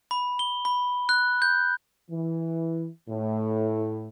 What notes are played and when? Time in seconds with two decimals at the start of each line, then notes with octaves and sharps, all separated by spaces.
0.11 B5
0.39 G7
0.65 B5
1.09 F#6
1.42 G6
2.10 E3
3.09 A2